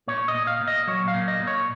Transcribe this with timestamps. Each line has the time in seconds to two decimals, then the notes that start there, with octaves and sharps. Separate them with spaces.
0.08 A#2 C#5
0.28 D#5
0.34 A#2
0.47 F5
0.61 A#2
0.68 D#5
0.87 F#3 C#5
1.08 F5
1.14 A#2
1.28 D#5
1.41 A#2
1.47 C#5